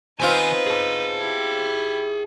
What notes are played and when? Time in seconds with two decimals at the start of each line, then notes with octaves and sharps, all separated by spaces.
0.20 D#3 B3 C4 D#4 F4 B4 G#5
0.67 G#4 A5
1.18 E4 G4